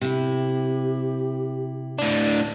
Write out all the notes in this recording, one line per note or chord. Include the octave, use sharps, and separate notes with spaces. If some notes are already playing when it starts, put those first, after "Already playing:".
C3 E4 G4
A2 D4